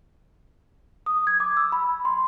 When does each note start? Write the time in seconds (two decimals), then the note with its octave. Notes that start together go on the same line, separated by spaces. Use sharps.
1.06 D#6
1.27 G#6
1.40 D6
1.57 E6
1.72 B5
2.05 C6